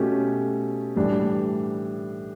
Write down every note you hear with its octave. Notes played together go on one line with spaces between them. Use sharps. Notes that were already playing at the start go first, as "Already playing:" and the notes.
Already playing: B2 A3 C#4 G4
A2 E3 G3 D4